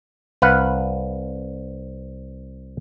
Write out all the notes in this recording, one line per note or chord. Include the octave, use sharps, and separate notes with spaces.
C2 B4 F5 F#5